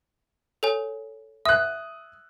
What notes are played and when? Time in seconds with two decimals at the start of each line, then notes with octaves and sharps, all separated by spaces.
0.63 A4 C#5 G#5
1.45 E5 D#6 F#6